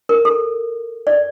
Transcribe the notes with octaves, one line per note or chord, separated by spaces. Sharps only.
A#4
A4
D5